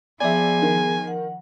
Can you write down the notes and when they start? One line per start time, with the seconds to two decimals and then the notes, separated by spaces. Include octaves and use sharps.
0.21 F3 B3 G#4 D5 E5 G#5
0.62 D#3
1.07 F#5